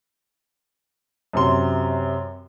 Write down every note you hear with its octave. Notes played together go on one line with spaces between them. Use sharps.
F#2 C3 C6